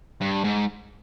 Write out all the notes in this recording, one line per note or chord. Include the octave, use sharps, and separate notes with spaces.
G2
G#2